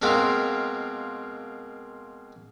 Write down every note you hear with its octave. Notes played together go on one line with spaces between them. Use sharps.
B2 G#3 A#3 C4 F4